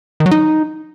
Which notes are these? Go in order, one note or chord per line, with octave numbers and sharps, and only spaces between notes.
D#3
F#3
D#4